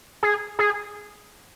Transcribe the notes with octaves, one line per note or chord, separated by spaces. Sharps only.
G#4
G#4